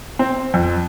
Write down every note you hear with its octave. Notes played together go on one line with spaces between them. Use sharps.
C4
F2